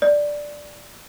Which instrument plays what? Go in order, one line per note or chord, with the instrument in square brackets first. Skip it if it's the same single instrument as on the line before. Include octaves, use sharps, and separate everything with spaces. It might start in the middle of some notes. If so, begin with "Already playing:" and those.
[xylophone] D5